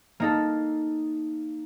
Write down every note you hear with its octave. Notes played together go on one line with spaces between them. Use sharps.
A#3 D#4 A4